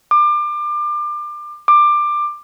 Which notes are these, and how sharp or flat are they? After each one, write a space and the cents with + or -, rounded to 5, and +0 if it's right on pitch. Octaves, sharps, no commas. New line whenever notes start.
D6 +30
D6 +20